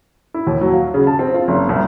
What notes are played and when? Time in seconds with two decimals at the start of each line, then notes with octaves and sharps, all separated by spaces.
0.34 E4
0.47 D#2
0.61 F#3
0.73 F5
0.94 C#3
1.07 A5
1.19 C4
1.34 F4
1.48 F#1
1.69 C2